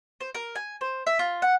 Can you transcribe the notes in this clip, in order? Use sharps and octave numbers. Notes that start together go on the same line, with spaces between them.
C5
A#4
G#5
C5
E5
F4
F#5